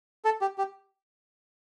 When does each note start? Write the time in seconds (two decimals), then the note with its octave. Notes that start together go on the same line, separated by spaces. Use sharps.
0.25 A4
0.41 G4
0.58 G4